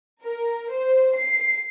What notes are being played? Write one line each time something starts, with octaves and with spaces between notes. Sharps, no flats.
A#4
C5
C7